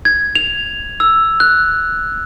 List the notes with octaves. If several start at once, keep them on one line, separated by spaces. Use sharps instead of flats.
G#6
F7
E6
F#6